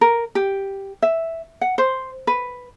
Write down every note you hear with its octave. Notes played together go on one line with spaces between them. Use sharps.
A#4
G4
E5
F#5
C5
B4